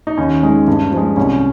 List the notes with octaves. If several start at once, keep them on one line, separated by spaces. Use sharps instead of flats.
D#4
D#2 C#4
D#3 G#3
G2
F3 G#3
C2 C#4